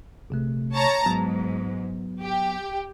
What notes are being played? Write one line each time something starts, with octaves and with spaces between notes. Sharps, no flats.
A#1 C3 A3
C#5 A5 A#5
G#2 F#3 B3
G4